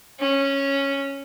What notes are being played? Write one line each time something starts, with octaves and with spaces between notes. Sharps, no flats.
C#4